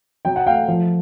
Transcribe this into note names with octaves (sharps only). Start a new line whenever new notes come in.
F#3 G5
F#5
A3 F5 G5
F3